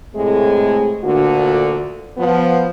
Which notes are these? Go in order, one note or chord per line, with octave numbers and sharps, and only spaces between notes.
A2 C3 G#3 A3 G#4
D2 A#2 D3 F#4
F3 B3